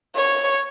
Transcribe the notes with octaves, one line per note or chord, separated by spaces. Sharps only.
C#5